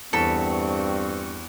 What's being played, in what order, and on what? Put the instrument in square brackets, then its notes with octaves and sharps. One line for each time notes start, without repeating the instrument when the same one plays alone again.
[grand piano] E2 [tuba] G2 [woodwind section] C4 C#6 [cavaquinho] A4 E5 B5